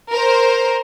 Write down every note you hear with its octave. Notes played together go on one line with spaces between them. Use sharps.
A#4 C5